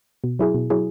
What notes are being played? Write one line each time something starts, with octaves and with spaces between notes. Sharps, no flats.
B2
F#3 E4 G#4
B2
F#3 E4 G#4